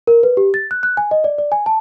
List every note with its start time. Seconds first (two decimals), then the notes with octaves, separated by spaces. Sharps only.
0.07 A#4
0.23 B4
0.37 G4
0.54 A6
0.71 F#6
0.83 F#6
0.97 G#5
1.11 D#5
1.24 D5
1.38 D5
1.52 G#5
1.66 A5